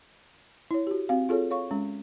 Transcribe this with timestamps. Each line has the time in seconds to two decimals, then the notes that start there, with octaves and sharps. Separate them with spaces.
0.71 E4 C#5
0.87 F#4 G4
1.09 C4 F#4 F5
1.29 F4 G#4 A4 C#5
1.51 C#5 F5 C#6
1.71 G#3 C#4